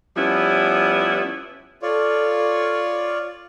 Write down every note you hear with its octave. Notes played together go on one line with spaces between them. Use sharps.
F3 G3 B3 C#4 E4
F4 A4 C#5 D5